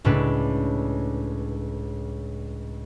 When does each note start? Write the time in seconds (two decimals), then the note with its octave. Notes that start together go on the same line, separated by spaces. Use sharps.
0.05 C#2 A2 D4 B4